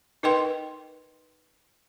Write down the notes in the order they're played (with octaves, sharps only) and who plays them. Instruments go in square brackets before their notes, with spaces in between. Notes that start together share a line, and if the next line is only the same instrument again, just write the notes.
[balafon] D#4 A#4 B4 D#5 G5 C6